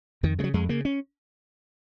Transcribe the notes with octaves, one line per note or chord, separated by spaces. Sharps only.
F2 D#3
C#3 G#3
F#3
F2 G#3
C#3 A#3
C#4